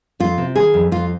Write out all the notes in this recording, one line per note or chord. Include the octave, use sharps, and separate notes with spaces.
F2 F4
C3
D#3 G#4
F2
F2 F4